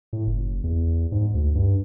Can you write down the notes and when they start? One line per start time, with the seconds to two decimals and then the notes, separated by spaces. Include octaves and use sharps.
0.13 A2
0.27 F#1
0.64 E2
1.12 G#2
1.34 D2
1.55 G2